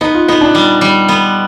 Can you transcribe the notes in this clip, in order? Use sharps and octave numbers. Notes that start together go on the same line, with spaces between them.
B3 D#4
F4
B3 D#4
D4
G3
G3
B3